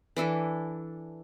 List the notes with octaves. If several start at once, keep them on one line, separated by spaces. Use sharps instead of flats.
E3 D4 E4 A4